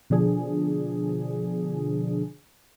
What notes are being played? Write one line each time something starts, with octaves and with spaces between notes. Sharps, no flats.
B2 D3 F3 D4 G#4